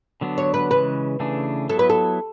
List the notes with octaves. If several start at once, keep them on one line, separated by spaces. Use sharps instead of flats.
D3 F#3 B3 D4
C#5
B4
C#3 E3 G#3 B4
C#3 E3 A3 D4 G#4
F#3 B3 E4 A4
B4
A4